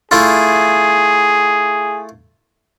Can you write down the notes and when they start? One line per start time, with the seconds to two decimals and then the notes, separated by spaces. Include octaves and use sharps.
0.11 A3 E4 F4 G#4